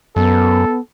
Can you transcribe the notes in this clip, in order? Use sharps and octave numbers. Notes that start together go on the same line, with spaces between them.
F#2 B3 A4